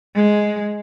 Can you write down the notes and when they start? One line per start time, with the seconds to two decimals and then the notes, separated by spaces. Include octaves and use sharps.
0.16 G#3